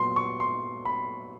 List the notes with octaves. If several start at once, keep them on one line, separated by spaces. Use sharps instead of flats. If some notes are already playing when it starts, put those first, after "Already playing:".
Already playing: A#2 F#3 B3 C6
C#6
C6
B5